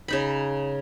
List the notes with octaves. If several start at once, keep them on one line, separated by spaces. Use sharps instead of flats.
C#3 D#4 B5